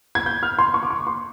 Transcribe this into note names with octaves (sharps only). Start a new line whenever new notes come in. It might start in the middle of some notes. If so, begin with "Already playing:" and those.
G#6
G6
F6
C6
C#6
D6
C#6
C6